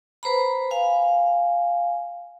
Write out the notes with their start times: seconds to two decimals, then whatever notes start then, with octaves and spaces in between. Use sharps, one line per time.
0.23 B4 C5 A#5 B5
0.71 F5 G#5